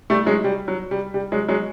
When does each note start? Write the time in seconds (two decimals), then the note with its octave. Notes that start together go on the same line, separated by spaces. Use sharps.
0.10 G3 A3
0.26 F#3 G#3
0.44 G3
0.68 F#3
0.91 G3
1.14 G3
1.32 F#3 G#3
1.49 F#3 G#3